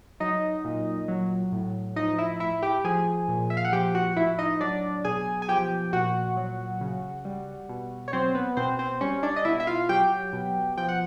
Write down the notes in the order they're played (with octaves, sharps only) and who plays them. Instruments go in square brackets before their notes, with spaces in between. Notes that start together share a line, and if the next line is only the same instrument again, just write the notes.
[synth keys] F#3 D#4 D#5
A#2
F#3
A2
F3 D#4 D#5
E4 E5
A2 E4 E5
G4 G5
F3 G#4 G#5
A#2
E5
F5
F#5
F3 G4 G5
F#4 F#5
A2 E4 E5
D#4 D#5
F#3 D4 D5
B2 G#4 G#5
G#5
F3 G4 G5
A#2 F#4 F#5
F#3
C#3
G3
B2
C#5
F#3 C4 C5
B3 B4
B2 C4 C5
C4 C5
G3 C#4 C#5
D4 D5
D#5
B2 E4 E5
E5
F4 F5
F#3 G4 G5
B2
F3 G5
F#5